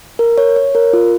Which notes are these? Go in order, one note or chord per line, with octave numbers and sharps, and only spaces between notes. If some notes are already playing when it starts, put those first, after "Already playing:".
A#4
C#5
C#5
A#4
F4